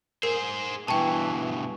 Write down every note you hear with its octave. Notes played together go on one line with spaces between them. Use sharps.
G#4 A#4 C5
G2 B2 E3 G5 A5 C#6